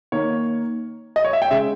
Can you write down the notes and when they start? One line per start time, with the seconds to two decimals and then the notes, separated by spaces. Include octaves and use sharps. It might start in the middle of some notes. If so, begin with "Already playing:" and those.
0.12 D#3 A#3 C#5
1.16 D#5
1.25 C#5
1.33 E5
1.42 G5
1.51 C#3 G#3 E5